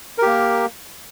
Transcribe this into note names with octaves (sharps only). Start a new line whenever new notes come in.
A#3 G4 A#4